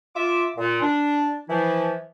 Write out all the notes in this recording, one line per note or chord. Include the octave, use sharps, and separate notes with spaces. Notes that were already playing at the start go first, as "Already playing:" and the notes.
F4 E5 D6
A#2
D4
E3 F3 E4